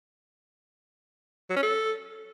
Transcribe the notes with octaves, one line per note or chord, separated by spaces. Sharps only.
F#3
C#4
A4